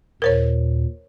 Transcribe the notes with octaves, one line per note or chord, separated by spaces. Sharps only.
D#2 A#2 A#4 C5 C#5